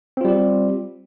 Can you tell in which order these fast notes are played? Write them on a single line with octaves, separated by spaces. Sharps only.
C4 F4 G3 G4